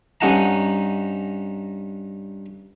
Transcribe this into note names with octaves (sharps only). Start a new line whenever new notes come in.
G2 C#4 D#4 F#5 A5 A#5